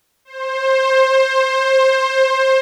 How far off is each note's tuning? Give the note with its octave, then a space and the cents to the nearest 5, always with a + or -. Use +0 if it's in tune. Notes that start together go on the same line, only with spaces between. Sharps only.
C5 +20